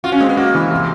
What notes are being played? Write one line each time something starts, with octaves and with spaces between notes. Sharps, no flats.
F4 F#4
C#4
G#3 C4
B3
A#3 F#4
E3
C3